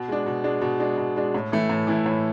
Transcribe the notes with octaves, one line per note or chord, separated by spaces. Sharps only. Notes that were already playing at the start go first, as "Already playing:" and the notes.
Already playing: B2
G#3 D4
B2
G#3 D4
B2
G#3 D4
B2
G#3 D4
A2
E3 A3 E4
A2
E3 A3 E4
A2